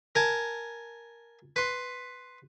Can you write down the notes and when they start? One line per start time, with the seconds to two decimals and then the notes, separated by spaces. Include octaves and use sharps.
0.15 A#4 G#5 A5
1.56 B4 C6